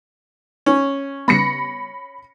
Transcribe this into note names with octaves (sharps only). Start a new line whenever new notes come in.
C#4
C#3 G3 B3 B5 A#6 C#7